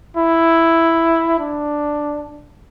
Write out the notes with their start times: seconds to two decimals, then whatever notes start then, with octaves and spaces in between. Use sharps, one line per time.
0.17 E4
1.39 D4